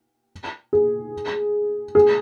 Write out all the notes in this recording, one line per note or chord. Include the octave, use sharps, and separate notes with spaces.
G#4
G#4